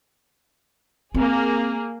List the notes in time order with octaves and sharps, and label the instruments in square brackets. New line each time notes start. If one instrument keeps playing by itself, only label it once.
[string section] A#3 G#4 [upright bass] C4